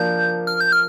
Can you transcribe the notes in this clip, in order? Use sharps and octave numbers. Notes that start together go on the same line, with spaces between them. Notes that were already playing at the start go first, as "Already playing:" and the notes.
Already playing: F3 A#3 D4 G6
F6
G6
F6